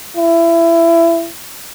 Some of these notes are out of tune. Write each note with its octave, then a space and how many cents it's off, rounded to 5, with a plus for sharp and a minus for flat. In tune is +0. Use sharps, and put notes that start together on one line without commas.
E4 +25